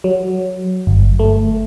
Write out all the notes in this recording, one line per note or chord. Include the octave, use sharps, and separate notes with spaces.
F#3
G1
A3